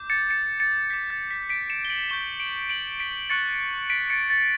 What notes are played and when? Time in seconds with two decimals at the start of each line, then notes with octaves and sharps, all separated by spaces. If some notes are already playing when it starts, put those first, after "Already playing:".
Already playing: D6 G6
0.10 A6 C#7
0.30 A6 C#7
0.60 A6 C#7
0.90 G6 B6
0.94 D6
1.10 A6
1.31 B6
1.49 B6 D7
1.70 C#7 E7
1.85 G7
1.90 D7 F#7
2.10 C#6 G6 E7 G7
2.40 D7 F#7
2.70 D7 F#7
3.00 B6 D7
3.30 C#6 F#6 A6 C#7
3.90 B6 D7
4.10 A6 C#7
4.30 A6